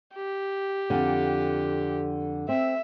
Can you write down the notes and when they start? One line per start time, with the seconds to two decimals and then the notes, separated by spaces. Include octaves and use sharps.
0.14 G4
0.90 F2 D3
2.49 C4 E5